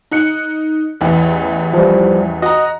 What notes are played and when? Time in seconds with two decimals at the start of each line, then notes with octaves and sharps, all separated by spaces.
0.11 D#4 F#6 C#7
1.01 A1 E2 E3
1.74 F3 G3
2.42 F#4 D#5 A#5